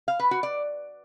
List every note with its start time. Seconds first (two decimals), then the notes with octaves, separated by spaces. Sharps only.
0.08 F5
0.19 B4
0.31 F#4
0.43 D5